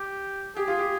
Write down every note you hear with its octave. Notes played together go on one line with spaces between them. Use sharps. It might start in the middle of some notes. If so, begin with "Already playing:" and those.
Already playing: G4
G4 G#4
F4
G4